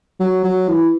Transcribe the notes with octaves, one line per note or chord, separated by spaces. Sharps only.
F#3
F#3
E3